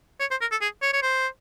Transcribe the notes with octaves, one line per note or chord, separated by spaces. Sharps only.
C#5
C5
A#4
A4
G#4
C#5
C#5
C5